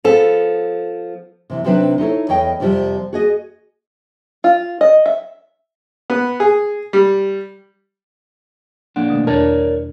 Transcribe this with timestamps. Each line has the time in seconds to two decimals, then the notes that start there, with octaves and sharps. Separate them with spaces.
0.04 F3 B3 A4
1.50 C3 E3
1.65 C3 D#3 F#3 C4 D4 B4
1.98 D#4 E4 A4 C#5
2.29 E2 C#5 D#5 G5
2.60 F2 C3 F3 G3
3.13 F#4 G#4 D#5
4.44 F4
4.81 D#5
5.06 E5
6.10 B3
6.40 G#4
6.93 G3
8.96 F2 A#2 D4 F#5
9.10 B2 D#3 A3
9.27 E2 D4 A#4 C#5 D5 A5